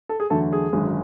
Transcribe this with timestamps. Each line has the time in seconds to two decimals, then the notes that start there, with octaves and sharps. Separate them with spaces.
0.09 A4
0.20 G#4
0.30 E2 D3 F#3 A3 A4
0.53 G#4
0.73 G#1 F#2 D3 G#3